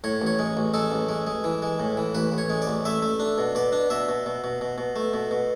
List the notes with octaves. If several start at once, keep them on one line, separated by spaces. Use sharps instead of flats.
A2 C#5
A1 C#5
G#3
A1
G#3 A4
A1
G#3
G#3
E3
G#3
A2
E3
A1 B4
A1
C#5
G#3
D5
A1
A3 E5
A3
D4
B2
B2 D5
D4
B2 E5
B2
B2
B2
B2
B2
A3
B2
B2